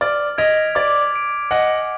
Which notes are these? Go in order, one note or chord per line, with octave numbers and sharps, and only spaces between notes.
D5 F6
D#5 G#6 B6 D7 F7
D5 D6
G#6 D7
D#5 F#5 G#5